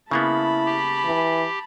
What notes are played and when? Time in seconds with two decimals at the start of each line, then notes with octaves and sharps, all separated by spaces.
0.11 C#3 A#3 B3 E4 A5 B5
0.66 G4
1.05 E3